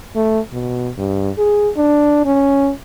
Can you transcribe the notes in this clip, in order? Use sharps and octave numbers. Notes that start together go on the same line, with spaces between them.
A3
B2
G2
G#4
D4
C#4